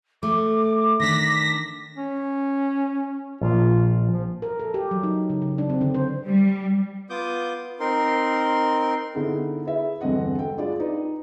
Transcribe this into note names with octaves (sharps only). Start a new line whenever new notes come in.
A3 D6
D#3 D4 A#6 B6
C#4
A#1 F4
F3
A#4
A4
G4
F#3
D#4
C#3
C#3
D4
C4
D3
C5
G3
B3 F4 D6 D#6 G6
C4 D#4 A#4 C6
D3 B3 D#4 E4 G#4
E4 G#4 B4 E5
E1 G2 D3 C4 D#5 F#5
A4 G5
G#3 D4 F4 D5
D#4 B4 D5